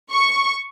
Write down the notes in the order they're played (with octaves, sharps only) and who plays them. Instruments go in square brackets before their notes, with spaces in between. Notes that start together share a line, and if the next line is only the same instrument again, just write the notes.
[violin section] C#6